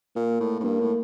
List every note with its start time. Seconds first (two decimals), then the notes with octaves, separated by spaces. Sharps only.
0.16 A#2 A#3
0.40 A2
0.60 A2
0.64 G2 A#3
0.81 A2